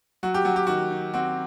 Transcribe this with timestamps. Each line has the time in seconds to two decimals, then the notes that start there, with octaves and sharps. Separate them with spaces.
0.23 F#3 F#4
0.34 G4
0.45 F#3 F#4
0.56 G4
0.67 D#3 F#4
0.91 D#4
1.14 C4 F#4